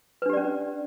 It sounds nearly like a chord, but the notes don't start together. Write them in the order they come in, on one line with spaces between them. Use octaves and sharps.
B4 D4 G4 D5 C#4